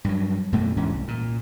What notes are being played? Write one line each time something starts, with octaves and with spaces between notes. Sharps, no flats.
G2 F#3
F#2 B2 A3 A#3
E2 G#2 E3 C#4
C2
A#2